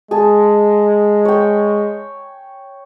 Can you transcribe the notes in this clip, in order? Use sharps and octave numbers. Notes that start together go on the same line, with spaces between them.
G#3 G#4 A5
C#5 G5